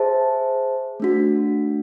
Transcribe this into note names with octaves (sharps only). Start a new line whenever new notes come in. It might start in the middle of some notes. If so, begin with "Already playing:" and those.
Already playing: G#4 C5 E5 A5
A3 D4 F#4